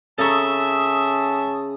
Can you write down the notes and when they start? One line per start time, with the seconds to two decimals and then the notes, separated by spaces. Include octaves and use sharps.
0.18 C#3 C#4 A4 E5 A5 A#5 C#6 D#6